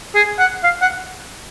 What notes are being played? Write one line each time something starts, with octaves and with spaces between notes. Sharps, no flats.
G#4
F#5
F5
F#5